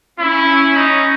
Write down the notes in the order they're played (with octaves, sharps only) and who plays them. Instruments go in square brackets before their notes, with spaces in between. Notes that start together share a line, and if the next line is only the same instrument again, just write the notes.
[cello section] C#4 [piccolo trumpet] E4
[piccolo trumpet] D#4